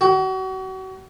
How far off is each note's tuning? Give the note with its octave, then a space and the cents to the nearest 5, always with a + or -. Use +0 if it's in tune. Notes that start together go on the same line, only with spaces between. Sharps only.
F#4 +35